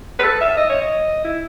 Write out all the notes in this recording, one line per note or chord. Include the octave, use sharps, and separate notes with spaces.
B4
A4
E5
D#5
C#5
D#5
E4